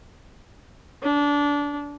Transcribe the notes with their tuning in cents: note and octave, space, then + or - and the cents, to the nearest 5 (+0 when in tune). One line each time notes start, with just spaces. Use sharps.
D4 -20